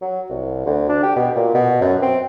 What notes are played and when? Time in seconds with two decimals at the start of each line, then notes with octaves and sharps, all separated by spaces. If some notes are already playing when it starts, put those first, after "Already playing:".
0.02 F#3
0.30 C2
0.66 D2
0.89 D4
1.03 G4
1.16 B2
1.35 A#2
1.54 B2
1.82 F#2
2.02 C4